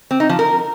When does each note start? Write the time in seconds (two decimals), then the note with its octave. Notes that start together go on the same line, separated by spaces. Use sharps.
0.11 C4
0.20 D#4
0.29 F3
0.39 A#4